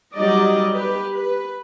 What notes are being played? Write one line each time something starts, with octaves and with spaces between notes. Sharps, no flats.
F#3 G3 D#4 G4 D5 D#5
G4 B4
B4